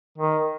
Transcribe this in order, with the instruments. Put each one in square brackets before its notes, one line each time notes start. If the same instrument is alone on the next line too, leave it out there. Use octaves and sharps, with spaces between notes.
[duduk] D#3